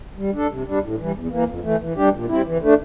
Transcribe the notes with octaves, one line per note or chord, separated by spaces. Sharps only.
G3
D4 A4
C3
G3 D4
A2
E3 G3
E2
E3 A#3
F2
E3 A3
E3
G3 D4 G4
A#2
G3 C4 E4
E3
A3 D4